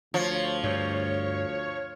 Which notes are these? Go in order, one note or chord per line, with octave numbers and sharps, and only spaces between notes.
D2 F3 C#5
G2 C#5